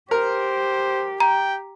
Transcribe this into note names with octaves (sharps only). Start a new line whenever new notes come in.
G4 A#4 C5
G5 A#5